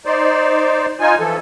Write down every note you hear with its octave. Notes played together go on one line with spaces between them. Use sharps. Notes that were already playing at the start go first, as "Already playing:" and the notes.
D#4 C5 D5
D#4 F4 G#5
E3 F3 A4